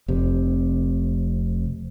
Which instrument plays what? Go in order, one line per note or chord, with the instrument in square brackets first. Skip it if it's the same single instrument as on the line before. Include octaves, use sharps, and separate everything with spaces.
[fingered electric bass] F1 C3